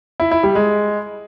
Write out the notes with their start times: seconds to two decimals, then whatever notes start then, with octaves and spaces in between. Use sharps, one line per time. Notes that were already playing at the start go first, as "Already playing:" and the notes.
0.20 E4
0.31 E4
0.43 G3
0.55 G#3